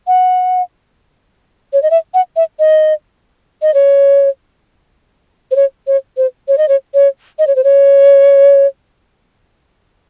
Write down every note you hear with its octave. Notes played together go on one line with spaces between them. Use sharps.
F#5
C#5
D#5
E5
F#5
E5
D#5
D#5
C#5
C5
C#5
C#5
C5
C#5
D#5
C#5
C#5
D#5
C#5
C5
C#5